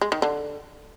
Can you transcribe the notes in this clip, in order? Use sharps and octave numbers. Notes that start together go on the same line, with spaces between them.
G#3
D#3
D3